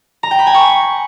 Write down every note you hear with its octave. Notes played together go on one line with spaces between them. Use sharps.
A#5
G5
B5
G#5
C#6